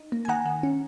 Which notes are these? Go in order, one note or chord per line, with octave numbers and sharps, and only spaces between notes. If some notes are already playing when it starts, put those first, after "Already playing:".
Already playing: D#4
A#3
G#5
D#3 F#5 A#5
D#3
C#4